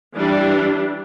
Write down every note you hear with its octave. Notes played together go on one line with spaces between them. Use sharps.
E3 G3 D4